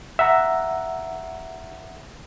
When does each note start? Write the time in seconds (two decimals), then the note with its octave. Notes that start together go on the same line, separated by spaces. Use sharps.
0.19 E5 F#5 A#5